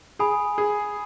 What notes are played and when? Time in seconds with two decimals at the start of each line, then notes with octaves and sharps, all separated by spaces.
0.19 G#4 G#5 B5 D#6
0.58 G#4